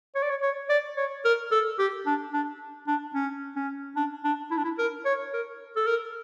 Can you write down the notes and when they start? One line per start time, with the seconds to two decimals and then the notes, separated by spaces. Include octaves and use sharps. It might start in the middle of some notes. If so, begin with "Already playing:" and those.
0.15 C#5
0.22 D5
0.30 C#5
0.42 C#5
0.70 D5
0.97 C#5
1.25 A#4
1.52 A4
1.79 G4
2.06 D4
2.33 D4
2.87 D4
3.15 C#4
3.56 C#4
3.96 D4
4.24 D4
4.51 E4
4.57 D4
4.64 E4
4.79 A#4
5.05 C#5
5.33 A#4
5.76 A4
5.87 A#4